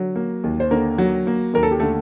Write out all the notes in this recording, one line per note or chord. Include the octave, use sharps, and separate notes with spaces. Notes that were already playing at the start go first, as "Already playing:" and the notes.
Already playing: D3 F#3
A#3
D#2
C5
D3 A#3 A#4
F#3
A#3
D#2 A#4
A4
G4
D3 A3 A4